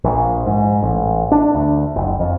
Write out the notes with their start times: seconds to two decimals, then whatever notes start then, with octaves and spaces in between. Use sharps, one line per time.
0.04 A#1
0.47 G#2
0.82 A1
1.32 D4
1.55 D2
1.96 F#1
2.20 F2